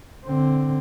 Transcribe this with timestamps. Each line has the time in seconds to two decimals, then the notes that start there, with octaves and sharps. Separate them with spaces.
0.25 D3 C4